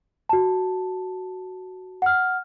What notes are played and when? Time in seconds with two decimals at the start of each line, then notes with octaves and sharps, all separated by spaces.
0.29 F#4 A5
2.02 F#5 F6